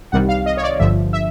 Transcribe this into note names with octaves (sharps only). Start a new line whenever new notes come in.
C2 C3 D#3 G3 F#5
F5
D#5
C#5
D5
G1 G2 D3 F3 E5
E5